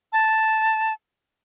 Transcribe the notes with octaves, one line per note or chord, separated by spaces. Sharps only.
A5